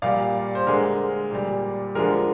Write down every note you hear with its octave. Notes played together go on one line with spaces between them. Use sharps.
A#2 G3 D5 F5
C5
D3 G#3 A#4
A#2 G3
D3 F3 G#3 A#4